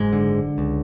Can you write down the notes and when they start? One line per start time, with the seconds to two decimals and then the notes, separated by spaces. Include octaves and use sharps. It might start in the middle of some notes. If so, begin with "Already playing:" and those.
Already playing: F#1 G#2 G#3
0.13 D3
0.58 C#2